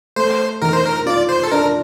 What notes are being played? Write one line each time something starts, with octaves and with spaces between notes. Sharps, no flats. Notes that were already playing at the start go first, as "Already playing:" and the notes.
A3 C5
D#3 A#4
C5
A#4
F4 D5
C5
A4
D4 A#4